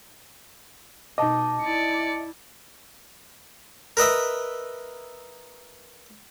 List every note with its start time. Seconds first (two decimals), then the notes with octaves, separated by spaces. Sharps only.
1.18 B2 D#4 D#5 A5 D6
1.62 E4 D5 C#7
3.97 A#4 B4 D#5 E5